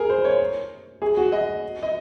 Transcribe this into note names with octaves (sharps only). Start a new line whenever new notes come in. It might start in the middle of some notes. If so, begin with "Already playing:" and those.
Already playing: G#4 A#4
C5
C#5
G#4
F#4
D#5
D#5